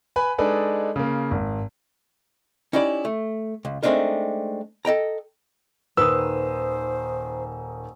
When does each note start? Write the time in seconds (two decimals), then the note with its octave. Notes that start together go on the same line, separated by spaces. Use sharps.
0.16 B4 G#5 B5
0.38 G#3 D4 D#4 A4 B4 G#5
0.96 C#3 A#3
1.31 G#1
2.73 C#4 D#4 E4 G4 D5
3.05 A3
3.65 C#2
3.83 G#3 A3 C4 D4 D#4 A#4
4.85 A4 D#5 G5 A#5
5.97 D#1 D#3 B4 C5 D#6 E6